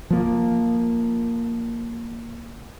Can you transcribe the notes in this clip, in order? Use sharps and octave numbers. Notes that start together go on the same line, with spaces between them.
F3 A#3